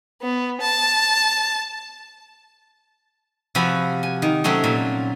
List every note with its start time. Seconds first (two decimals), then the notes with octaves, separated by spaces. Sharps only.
0.22 B3
0.61 A5
3.55 C3 F3 F#4 G#5 B5
4.03 G#5
4.22 D#3
4.44 C3 F#3 A3 C4 C#4
4.64 A#2